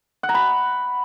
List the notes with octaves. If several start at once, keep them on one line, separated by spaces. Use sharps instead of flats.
F#5
A#5
B5